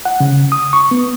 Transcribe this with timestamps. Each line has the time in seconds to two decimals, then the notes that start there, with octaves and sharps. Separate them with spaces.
0.05 F#5
0.20 C#3
0.52 D#6
0.73 C#6
0.91 B3